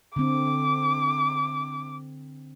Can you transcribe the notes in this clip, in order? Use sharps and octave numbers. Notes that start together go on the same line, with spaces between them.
D3 C4 D6